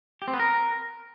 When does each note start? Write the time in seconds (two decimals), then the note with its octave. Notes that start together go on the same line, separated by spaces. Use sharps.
0.22 G4
0.28 C4
0.34 B3
0.39 A#4